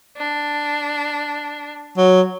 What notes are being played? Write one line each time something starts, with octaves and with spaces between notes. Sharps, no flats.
D4
F#3